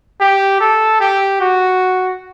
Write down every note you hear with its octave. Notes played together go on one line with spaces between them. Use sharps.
G4
A4
G4
F#4